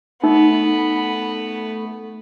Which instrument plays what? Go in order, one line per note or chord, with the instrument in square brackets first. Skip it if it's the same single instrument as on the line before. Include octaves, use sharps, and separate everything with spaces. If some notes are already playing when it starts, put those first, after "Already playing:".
[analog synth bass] A3 [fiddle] B3 [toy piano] D#4